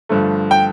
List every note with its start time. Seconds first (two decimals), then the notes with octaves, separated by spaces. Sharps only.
0.09 G2 D3 F3 A3
0.51 G5